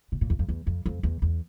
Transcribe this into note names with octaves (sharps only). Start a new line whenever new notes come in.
B2
A#2
E2
F2
E2
F2
F2
E2
E2